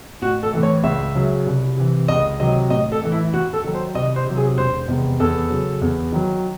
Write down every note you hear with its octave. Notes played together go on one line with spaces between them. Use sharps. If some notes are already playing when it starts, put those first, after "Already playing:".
A1 F#4
A4
A2 E3
C#5
C#2 E5
C#3 F#3
C2
C3 E3
C#2 D#5
C3 D#3 F#3 D#5
A1 D#5
A4
A2 E3
E4
D#2 F#4
A4
D#3 F#3
C5
C2 D#5
C5
C3 F#3
G#4
E1 C5
E2 C3 D#3
E2 A4
C#3 F#3
E2
D#3 F#3